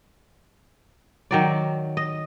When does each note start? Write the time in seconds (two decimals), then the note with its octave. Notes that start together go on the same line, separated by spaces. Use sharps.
1.31 D#3 F#3 D5
1.97 D#5